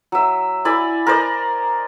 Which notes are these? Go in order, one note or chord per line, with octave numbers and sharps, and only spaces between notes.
F#3 E5
E4 D5 G#5 B5
A#4 C5 D5 D#5